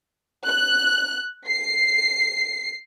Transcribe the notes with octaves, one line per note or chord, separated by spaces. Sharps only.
F#6
C7